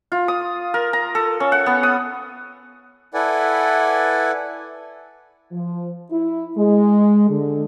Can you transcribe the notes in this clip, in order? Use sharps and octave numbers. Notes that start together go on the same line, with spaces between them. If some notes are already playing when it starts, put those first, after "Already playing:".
F4
D#6
A#4
A#5
A4
C#4
F#5
B3
D#6
E4 A4 B4 D5 F#5 G#5
F3
E4
G#3
D3